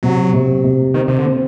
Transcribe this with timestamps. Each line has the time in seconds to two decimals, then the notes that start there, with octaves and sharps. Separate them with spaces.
0.03 C3 F#3
0.33 C3
0.64 C3
0.94 D#3 C4
1.08 C3
1.18 D3
1.25 C4